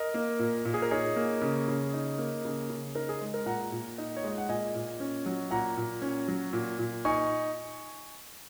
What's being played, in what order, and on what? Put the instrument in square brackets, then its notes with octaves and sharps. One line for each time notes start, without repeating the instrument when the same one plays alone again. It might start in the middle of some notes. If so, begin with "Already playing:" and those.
Already playing: [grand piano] A#4 D#5
A#3
A#2
A#2
G#4
A#4
D#4 G#4 C#5
A#3
C#3
C#3
D#4
A#3
C#3
C#3
D#4 A#4
G#4
G#3
A#4
A#2 F#5 A#5
A#2
D#4
C#5
G#3 D#5
F#5
A#2 D#5 G#5
A#2
C#4
F#3
A#2 F#5 A#5
A#2
C#4
F#3
A#2
A#2
D#4 G#5 C#6